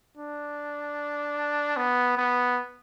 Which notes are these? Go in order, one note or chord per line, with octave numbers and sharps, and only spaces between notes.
D4
B3
B3